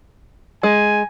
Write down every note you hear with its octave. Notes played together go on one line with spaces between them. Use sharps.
G#3 G#5